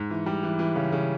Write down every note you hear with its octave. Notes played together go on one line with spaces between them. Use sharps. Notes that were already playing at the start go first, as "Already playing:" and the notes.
Already playing: G#2
E3
G3
E3
E3
C#3
C#3